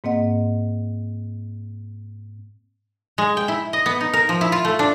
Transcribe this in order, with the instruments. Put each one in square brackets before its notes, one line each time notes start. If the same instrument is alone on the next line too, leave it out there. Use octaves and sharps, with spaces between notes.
[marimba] G#2 A#3 C4 D#5 F#5
[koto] G#3
G5
E4
D#5
B3
D#4
A#4
F3
E4
F4
A3
D4